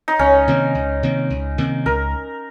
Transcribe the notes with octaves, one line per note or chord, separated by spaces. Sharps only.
D#4
C#2 C#4
C3 D#3 A#3
C#2
C3 D#3 A#3
C#2
C3 D#3 A#3
C#2 A#4